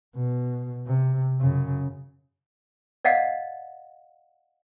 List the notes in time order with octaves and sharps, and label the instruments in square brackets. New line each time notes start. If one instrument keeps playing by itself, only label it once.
[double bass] B2
C3
F#2 C#3
[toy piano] D5 D#5 F5 F#5